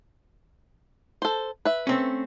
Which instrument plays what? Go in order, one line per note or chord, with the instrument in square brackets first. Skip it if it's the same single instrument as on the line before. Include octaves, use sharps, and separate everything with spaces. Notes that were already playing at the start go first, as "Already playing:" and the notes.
[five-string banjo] A4 C5
B4 E5
[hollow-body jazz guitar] A3 C4 C#4